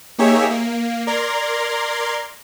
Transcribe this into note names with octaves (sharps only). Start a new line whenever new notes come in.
A#3 D#4 G4 G#4 C#5 E5
A#3
A#4 D5 A#5 C6 G#6